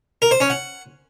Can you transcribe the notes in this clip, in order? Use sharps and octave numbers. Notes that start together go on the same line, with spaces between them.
A#4
C5
C#4
F#5